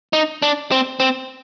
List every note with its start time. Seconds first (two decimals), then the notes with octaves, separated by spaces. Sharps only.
0.13 D#4
0.42 D4
0.71 C4
1.00 C4